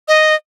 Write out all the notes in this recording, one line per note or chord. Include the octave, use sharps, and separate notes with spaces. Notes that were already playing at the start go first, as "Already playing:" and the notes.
D#5